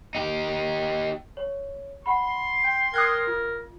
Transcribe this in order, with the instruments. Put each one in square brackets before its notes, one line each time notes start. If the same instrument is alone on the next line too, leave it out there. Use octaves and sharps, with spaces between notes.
[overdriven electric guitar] D#4 G4
[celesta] C#5
[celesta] F#5 B5 [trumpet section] C6
[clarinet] G5
[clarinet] A#4 [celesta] G5 E6 [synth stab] D#6 F#6 G#6
[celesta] F4